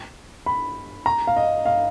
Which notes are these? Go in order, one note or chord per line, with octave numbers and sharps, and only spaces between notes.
B5
A#5
F5
D#5
F5